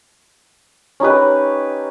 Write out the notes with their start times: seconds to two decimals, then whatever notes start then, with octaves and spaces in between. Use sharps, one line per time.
1.00 C#4 D#4 G4 B4